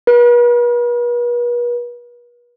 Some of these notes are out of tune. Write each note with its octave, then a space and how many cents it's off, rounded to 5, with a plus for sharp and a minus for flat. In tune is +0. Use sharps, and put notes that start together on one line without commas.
B4 -40